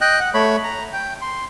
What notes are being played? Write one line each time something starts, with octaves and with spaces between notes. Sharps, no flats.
D#5 G5 F#6
F#5
A3 C#5 B5
A#5
G5
C6